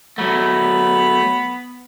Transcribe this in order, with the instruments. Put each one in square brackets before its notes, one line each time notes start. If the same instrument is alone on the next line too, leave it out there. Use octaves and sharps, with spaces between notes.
[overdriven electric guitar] F#3 A3 [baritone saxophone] B3